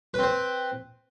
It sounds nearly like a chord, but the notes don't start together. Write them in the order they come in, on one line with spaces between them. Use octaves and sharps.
B4 C4 C5